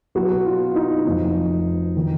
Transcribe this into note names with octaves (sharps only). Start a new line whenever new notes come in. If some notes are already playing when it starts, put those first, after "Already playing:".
B1 B2 F#4
F4
D#4
F1 F2 F3
D#3